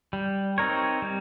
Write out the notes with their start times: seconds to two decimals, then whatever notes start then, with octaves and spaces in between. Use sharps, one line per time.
0.13 G3
0.58 C4 D#4 A#4 C#5
1.02 G3